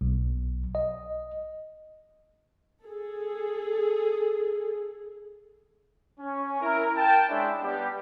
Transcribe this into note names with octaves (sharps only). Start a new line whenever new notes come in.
B1
D#5
G#4 A4
C#4
E4 A#4
G5 A5
G#3 C#4 D4 E4
G3 B3 G4